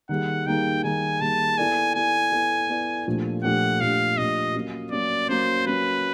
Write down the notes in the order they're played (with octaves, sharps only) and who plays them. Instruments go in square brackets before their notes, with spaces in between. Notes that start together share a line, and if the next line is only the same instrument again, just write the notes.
[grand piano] D#3 G3 A#3 D#4 G#4 [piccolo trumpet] F#5
[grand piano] D#3 G3 A#3 D#4 G#4 [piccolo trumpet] G5
[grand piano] D#3 G3 A#3 D#4 G#4 [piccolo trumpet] G#5
[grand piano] D#3 G3 A#3 D#4 G#4 [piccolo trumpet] A5
[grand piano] B3 E4 A4 D5 [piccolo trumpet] G#5
[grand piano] B3 E4 A4 D5 [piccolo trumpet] G#5
[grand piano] B3 E4 A4 D5
B3 E4 A4 D5
A#2 F3 A3 D4 G4
[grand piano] A#2 F3 A3 D4 G4 [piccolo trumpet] F#5
[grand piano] A#2 F3 A3 D4 G4 [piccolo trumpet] F5
[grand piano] A#2 F3 A3 D4 G4 [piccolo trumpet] D#5
[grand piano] F#3 A#3 C#4
[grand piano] F#3 A#3 C#4 [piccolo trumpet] D5
[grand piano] F#3 A#3 C#4 [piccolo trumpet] C5
[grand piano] F#3 A#3 C#4 [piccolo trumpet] B4